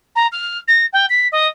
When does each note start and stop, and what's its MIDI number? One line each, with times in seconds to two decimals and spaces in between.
0.15 0.27 82
0.32 0.58 89
0.68 0.86 94
0.93 1.06 79
1.09 1.28 95
1.32 1.47 75